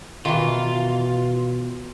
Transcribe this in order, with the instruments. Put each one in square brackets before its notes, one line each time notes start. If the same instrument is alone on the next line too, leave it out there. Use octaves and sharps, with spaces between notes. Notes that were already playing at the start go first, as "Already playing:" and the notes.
[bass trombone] B2 [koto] D#3 E3 [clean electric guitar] F4